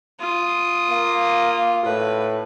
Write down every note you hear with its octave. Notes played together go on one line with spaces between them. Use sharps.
F4 D#6
A#3 F5
A2 B4